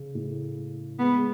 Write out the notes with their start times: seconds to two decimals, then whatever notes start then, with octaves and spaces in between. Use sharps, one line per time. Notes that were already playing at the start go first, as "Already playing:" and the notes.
Already playing: C#3
0.15 A2
0.99 G#3 B3
1.17 G#3